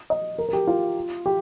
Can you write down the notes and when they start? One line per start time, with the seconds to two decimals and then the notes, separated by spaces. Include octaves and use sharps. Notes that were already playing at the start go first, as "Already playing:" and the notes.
0.10 D#5
0.38 A#4
0.49 A#4
0.53 G4
0.67 F4
1.26 G4